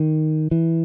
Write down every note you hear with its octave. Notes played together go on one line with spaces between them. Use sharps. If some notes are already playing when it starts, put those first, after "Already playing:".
Already playing: D#3
E3